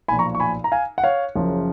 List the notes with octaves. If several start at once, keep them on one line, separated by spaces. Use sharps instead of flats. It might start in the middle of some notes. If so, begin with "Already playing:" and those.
B1 A#2 F3 G#5 B5
A#5 C#6
C#6
G#5 B5
A#5
F5 G#5
F#5
C#5 F5
F#1 F#2 C#3 F3